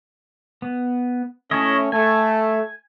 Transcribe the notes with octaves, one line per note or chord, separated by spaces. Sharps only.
B3
A3 C#4 E4 C#5 D#5
A3 G#5